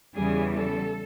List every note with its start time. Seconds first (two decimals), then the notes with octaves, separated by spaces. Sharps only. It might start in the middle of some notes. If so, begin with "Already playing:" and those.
0.15 E2 C#3 E3 G3 G#4
0.54 A4